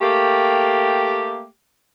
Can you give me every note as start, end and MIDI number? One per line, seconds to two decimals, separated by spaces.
0.01 1.47 57
0.01 1.47 58
0.01 1.47 67